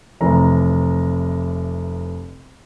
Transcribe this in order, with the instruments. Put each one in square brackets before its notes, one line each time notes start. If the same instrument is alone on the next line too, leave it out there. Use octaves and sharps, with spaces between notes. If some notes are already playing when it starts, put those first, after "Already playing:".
[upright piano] F1 E3 A#5